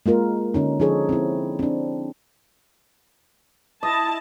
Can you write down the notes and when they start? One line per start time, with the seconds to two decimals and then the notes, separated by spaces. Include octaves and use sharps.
0.06 G#3 A#3 F4 A#4
0.54 D3 C#4 D#4
0.80 F3 D4 D#4 G#4 A4 C#5
1.09 C4 E4
1.59 C4 D4
3.83 E4 D#5 A5